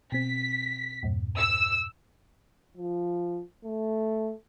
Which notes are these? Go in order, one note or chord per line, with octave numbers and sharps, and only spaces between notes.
B2 C4 B6
E2 G2 A#2
E6
F3
A3